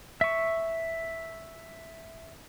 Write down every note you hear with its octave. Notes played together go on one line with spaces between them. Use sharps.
E5 C#6